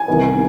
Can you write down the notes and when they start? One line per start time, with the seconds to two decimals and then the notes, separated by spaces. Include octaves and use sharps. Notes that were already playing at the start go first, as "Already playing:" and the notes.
Already playing: G#5
0.08 C2 C3 D#3 B3